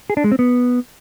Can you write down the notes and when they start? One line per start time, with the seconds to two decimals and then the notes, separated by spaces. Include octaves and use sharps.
0.10 G#4
0.17 D4
0.24 G#3
0.32 C4
0.39 B3